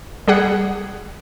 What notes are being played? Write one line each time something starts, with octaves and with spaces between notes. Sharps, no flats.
G3 G#4 F#5